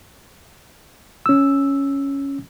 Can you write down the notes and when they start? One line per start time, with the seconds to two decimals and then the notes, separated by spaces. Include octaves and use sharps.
1.26 C#4 E6